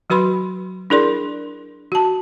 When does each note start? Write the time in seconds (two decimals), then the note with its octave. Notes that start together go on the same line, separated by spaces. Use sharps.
0.10 F#3 F#4 B4 B5 C6
0.90 D4 E4 G#4 A#4 D5 C6
1.92 F#4 A5